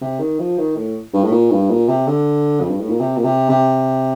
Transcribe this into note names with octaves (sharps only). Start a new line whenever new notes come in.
C3
D#3
F3
D#3
A2
G2
A2
A#2
G2
A#2
C3
D3
F2
G2
A2
A#2
C3
A#2
C3
C3